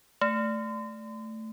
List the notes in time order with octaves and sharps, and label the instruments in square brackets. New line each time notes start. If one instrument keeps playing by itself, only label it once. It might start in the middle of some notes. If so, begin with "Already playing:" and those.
[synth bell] A3